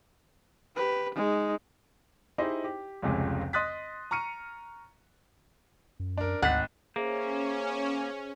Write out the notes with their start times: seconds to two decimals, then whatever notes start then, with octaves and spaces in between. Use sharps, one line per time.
0.76 G4 B4
1.15 G#3 D#4
2.38 D#4 E4 G4 G#4 C5 D#5
2.64 G4
3.02 F1 C#2 C3 G#3 C#4
3.53 D#5 C6 D#6 F#6 A6 B6
4.11 A#5 C#6 F6 C#7 D#7
6.00 F#2
6.18 D4 A#4
6.42 G#1 D2 F#5 A6 B6
6.96 A#3 C#4 G#4 C5 E5